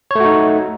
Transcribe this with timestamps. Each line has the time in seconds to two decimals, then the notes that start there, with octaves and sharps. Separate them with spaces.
0.11 C#5
0.15 A3
0.20 F#4
0.25 D#4